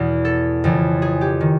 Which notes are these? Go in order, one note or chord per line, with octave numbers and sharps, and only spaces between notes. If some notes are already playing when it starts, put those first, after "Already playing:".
Already playing: E2 B2
A4
F2 C#3 E3
G#4
G4
D#3